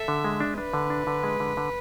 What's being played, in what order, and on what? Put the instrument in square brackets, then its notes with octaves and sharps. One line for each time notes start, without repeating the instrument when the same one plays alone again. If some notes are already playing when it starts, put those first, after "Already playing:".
Already playing: [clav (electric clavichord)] A4 [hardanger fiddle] E5
[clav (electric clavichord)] D3
G#3
D4
[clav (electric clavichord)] D4 [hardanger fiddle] B4
[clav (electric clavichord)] D3
D4
D3
G#3
D3
D3